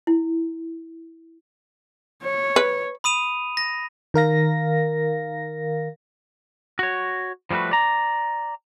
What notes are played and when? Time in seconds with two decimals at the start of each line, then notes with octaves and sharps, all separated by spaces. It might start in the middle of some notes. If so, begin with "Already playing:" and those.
0.07 E4
2.23 C#5
2.56 B4
3.04 B5 D#6 D#7 F7
3.57 A#6
4.14 D#3 A#4 F5 A#6
6.79 F#4 C#5
7.51 F3 G3 A3 F#4 B4
7.71 D5 A#5